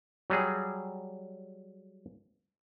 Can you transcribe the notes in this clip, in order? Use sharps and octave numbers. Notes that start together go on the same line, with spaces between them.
F#3 G3 G#4